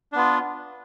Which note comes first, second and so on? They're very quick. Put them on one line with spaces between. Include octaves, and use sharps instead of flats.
D4 B3 F4